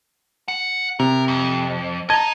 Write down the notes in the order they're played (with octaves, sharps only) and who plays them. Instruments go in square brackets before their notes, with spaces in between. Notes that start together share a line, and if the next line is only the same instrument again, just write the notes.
[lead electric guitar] F#5
[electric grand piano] C3 [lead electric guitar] A#4
[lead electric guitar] F2
[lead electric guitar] D#5 A#5 [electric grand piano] A5 G#6